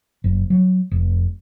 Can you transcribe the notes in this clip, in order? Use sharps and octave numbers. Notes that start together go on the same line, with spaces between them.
F#1
F#3
F1